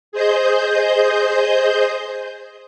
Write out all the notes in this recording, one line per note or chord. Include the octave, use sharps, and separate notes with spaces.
G#4 C5 D#5 G6